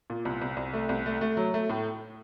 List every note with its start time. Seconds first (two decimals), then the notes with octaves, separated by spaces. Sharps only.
0.10 A#2
0.25 C2
0.42 C2
0.57 C2
0.73 A3
0.89 C2
1.06 A3
1.21 A3
1.37 F#3
1.54 A3
1.70 A2